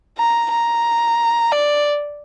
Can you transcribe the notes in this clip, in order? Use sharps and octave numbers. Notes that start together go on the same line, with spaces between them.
A#5
A#5
D5